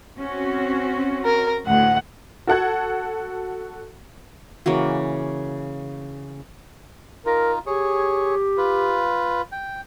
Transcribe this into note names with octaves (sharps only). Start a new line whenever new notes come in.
C4 C#4 F#4
A#4
D2 A2 F#5
F#4 A4 F#5 F#6 G#6
C#3 E3 A#3 F#4
D#4 F4 A#4
G4 G#4 C#5
F4 B4
G5